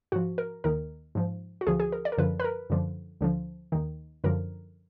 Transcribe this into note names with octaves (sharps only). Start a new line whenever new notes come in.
G#2 F3 F#4
A#4
D#2 D#3 A#4
G#2 F3
F#4
D2 D3 F3 G#4
G#4
A#4
D5
A#4
F#2 D3 F3 B4
B4
A#4
F#2 D3 F3
D2 D3 F3
D#2 D#3
F#2 D3 F3 A#4